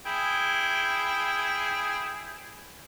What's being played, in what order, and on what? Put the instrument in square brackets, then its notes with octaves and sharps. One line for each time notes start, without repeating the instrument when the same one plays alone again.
[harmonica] E4 G#4 G5